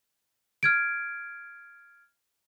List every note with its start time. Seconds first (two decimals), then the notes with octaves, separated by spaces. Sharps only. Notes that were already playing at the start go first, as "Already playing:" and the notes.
0.63 F6 G#6 D7